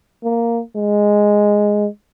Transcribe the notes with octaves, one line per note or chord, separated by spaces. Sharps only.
A#3
G#3